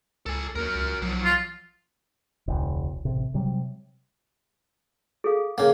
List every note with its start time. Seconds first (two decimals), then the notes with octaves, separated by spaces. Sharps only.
0.26 C#2 A4 G#5
0.55 D#2 F#4 A#4
0.75 C#2
1.02 B1 F3 F#3
1.25 F4
2.48 E1 C#2
3.05 A1 C3
3.34 C3 F#3 G3
5.24 G#4 A4 F5
5.58 C#3 A#3